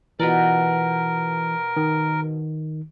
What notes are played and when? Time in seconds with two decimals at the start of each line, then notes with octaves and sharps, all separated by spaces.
0.20 B2 E3 F4 A#4 D5
1.77 D#3